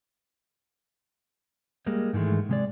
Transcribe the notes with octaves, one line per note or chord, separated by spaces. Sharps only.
G3 G#3 A#3
G#2 D#3 E3 G#3 A3
C3 G#3 D5